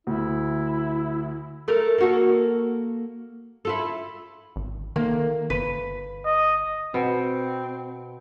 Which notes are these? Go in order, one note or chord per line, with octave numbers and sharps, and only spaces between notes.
D2 E4
A3 A#4
A#3 F#4 A4
E4 F4 A4
G#1
D#3 A#3
G1 B4
D#5
B2 C4